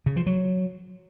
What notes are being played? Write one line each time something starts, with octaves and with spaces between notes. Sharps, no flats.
C#3
F3
F#3